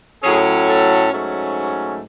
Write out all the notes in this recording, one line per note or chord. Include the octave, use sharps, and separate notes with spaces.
A2 F#3 C#4 G#4
A4
G#2 F#3 A3 C#4